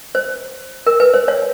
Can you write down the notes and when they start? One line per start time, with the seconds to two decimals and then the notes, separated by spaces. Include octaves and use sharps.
0.15 C5
0.87 A#4
1.00 B4
1.14 C5
1.28 C#5